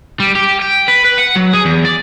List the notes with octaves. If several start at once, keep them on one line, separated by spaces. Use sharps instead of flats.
G3
G4
G5
B4
B4
F#5
F#3
G#4
E2
D5